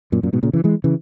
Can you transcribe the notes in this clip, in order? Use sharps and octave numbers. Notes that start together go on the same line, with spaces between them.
F#2 A#2
F#2 A#2
G#2 B2
A#2 C#3
C#3 E3
E3 G#3
C#3 E3